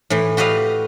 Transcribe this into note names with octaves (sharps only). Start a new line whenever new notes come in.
A2 E3
F#4 G4 B4 D#5 F5